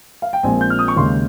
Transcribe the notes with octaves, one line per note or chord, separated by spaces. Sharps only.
F5
G5
A#1 A#2 G#3 C4 G#5
G6
F6
D#6
C#6
D#2 C#3 G#3 C6